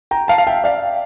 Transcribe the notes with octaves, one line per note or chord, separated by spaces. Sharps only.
G5 A#5
F5 A5
F5
E5 G5
D5 F5